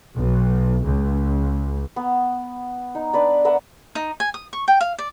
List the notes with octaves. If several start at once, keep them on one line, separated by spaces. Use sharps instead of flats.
B1
C#2
B3
D#4
D4 B4 D5
A#4 B4 E5 F#5
D#4
G#5
D#6
C#6
G5
F5
D5